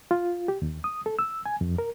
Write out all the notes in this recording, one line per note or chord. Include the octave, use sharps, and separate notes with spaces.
F4
G4
D#2
D#6
A4
E6
G#5
F2
A#4